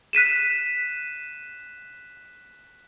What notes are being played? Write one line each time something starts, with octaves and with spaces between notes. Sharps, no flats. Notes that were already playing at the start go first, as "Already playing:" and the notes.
F#6 B6 D#7 E7